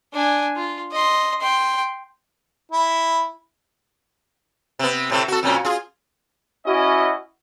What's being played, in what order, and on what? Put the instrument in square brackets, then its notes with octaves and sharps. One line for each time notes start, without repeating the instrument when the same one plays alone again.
[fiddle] D4 G#5
F4
D#5 C6
G5 C6
[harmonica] E4
[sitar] C3 B3
A2 C3 A3
F#4 A4
F2 A#2 C#4
F4 G#4
[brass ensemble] C#4 E4 F#4 D#5